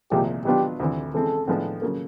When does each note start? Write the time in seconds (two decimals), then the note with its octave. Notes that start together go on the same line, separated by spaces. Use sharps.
0.11 C2 A#2 F3 G#3 G4
0.45 B2 F#3 B3 D4 F4 G4
0.80 D2 C3 E3
1.14 C#3 E3 G#3 C4 A4
1.48 A2 F3 G#3 B3 D4
1.82 C#3 F#3 A#3